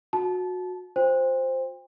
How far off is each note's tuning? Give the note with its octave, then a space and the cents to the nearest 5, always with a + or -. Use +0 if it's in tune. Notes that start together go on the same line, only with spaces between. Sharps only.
F#4 -20 A5 -25
F4 +45 C5 +0 G5 +35